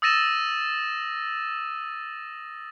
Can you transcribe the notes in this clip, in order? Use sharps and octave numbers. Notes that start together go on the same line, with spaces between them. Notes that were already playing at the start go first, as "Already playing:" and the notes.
D#6 E6 A6 A#6 D#7 E7